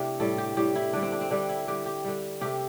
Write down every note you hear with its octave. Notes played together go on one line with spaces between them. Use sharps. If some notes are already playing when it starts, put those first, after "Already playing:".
Already playing: C3 A3 C4 D4 E4 G4
A2 G3 A4
G4
A2 G3 G4
E4
D3 G3 D4
C4
D4
C4
D3 G3 D4
E4
D3 G3 G4
G4
D3 G3
C3 A3 G4